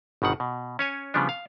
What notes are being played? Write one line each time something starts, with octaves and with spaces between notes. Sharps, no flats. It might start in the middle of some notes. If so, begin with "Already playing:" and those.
G1 B2 D#3 F#5
B2
C#4 C#5 G#5
C#3 F3 G3 B3 D4
F5